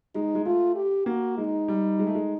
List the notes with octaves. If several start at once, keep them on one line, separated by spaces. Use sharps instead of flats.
G#3 D#4
G#3
A3 F4
G4
A#3 F#4
G#3 D#4
G3
G#3
A3
G#3